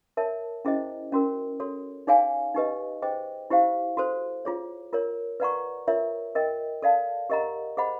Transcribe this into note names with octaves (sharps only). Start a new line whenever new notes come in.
A#4 C#5 E5 A5
C#4 E4 G#4 C5 D#5
C#4 F#4 A#4
F#4 A4 C#5
D#4 G#4 C#5 F5 G#5
D#4 G4 B4 D#5
G#4 C5 D#5 G5
E4 G4 C5 F5
F#4 A4 C5
F4 G#4 C#5
F4 A#4 C#5
B4 D5 F#5 A#5 C#6
F4 A#4 C#5 E5
A#4 D#5 G5
A4 D5 F5 A5
G4 A#4 D#5 F#5 A#5
G#4 C5 D#5 F#5 B5